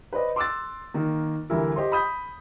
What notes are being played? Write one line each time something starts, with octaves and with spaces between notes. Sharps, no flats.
B4 C5 D5 D#5
C6 D6 E6 F#6 A6
D#3 A#3
D2 D3 E3 G3 E4 A#4
G4 C5 D#5 C6
B5 D#6 G6 B6